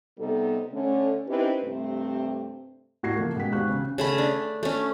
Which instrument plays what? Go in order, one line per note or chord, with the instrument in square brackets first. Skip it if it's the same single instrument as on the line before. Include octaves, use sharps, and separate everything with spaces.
[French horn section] C3 G3 B3 D#4 A4
D3 A3 C#4
C4 C#4 D#4 E4 G4 B4
G2 C3 A3 C4
[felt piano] A2 F#4 G#6 A#6 C7
C#3 F3 A3 A#3
B2 G#3 F#5 G5 B6
G#1 G#2 G4 F5 C#6 F#6
C#3 C4 C#4
[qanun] C#3 A3 B5
D4
A3 C#4